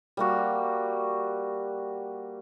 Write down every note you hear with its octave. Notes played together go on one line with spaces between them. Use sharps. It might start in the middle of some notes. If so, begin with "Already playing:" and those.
G3 A#3 F#4